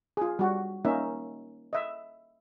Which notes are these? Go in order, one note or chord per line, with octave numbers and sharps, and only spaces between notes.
F4 G#4
G3 F#4
A#3 C#4 D#4 E5
D#5 E5